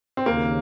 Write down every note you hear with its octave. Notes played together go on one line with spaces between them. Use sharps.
C4
D#2 C#3 A#3